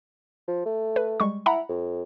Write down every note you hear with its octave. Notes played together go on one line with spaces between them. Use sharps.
F3
A3
B4
G3 G#3 C#6
E4 F#5 A#5 B5
F2